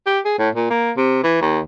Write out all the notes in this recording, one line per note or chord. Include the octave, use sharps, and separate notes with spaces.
G4
G#4
A2
A#2
A#3
C3
E3
D#2